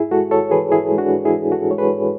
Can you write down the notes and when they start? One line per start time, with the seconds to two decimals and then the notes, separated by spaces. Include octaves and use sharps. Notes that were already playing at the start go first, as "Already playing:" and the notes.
Already playing: G#2 E4 G#4
0.11 G#3 F#4 A4
0.31 G#2 A4 C#5
0.51 E3 G#4 B4
0.71 G#2 E4 G#4
0.92 G#3
0.98 D4 F#4
1.11 G#2
1.25 E4 G#4
1.32 E3
1.51 G#2 F#4 A4
1.71 G#3 C#5
1.78 G#4 B4
1.92 G#2